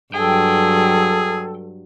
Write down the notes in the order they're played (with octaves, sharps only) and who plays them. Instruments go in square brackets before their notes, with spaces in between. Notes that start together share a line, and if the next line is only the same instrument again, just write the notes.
[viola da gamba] G2 F#3 [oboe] G#4 [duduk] A4 [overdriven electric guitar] G5